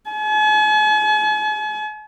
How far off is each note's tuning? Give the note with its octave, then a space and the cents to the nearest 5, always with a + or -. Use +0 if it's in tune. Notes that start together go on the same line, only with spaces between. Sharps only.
G#5 +45